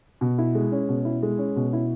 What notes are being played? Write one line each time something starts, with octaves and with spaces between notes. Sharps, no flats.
B2
E4
G#3
C#4
B2
E4
G#3
C#4
B2
E4